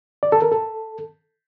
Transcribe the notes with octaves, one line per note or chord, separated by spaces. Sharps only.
D5
A4
A#4
A4